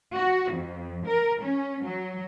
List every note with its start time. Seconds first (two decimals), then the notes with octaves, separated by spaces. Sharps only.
0.16 F#4
0.52 F2
1.06 A#4
1.42 C#4
1.85 F#3